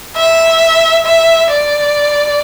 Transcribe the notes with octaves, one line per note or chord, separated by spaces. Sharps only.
E5
E5
D5